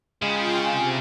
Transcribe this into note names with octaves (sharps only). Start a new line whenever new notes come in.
C#3 G#3 F4 G5
C3 G#5